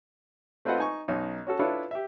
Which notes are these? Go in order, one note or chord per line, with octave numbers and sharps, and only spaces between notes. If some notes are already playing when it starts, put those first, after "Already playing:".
A3 C4 F4 B4 D#5 F#5
D#4 G#5 C#6
B1 C#4 D#4
C#4 F#4 A4
D4 E4 F4 A4 B4 C#5
G4 E5